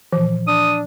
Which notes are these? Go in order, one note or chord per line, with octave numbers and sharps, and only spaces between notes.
A#2 E3 F3
D4 D#6